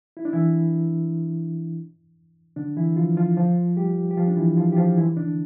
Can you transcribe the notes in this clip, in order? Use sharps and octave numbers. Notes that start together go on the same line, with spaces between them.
E4
D4
E3 E4
D3 D4
E3 E4
F3 F4
F3 F4
F3 F4
G3 G4
G4
F3 F4
D4
E3 E4
F3 F4
G4
F3 F4
E3 E4
D3 D4